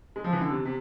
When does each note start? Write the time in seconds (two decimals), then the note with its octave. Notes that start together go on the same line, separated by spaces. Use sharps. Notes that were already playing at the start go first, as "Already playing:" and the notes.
0.16 G#3
0.24 F3
0.33 E3
0.41 D3
0.50 C3
0.65 C3